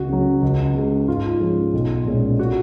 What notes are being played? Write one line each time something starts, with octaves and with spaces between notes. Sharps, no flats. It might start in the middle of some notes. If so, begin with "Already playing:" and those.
Already playing: C#2 F#4
C#3 F#3
C#2
C#3 G#3
G#2 F4
F3 G#3 C#4
B1
A#2 G#3 C#4
F#4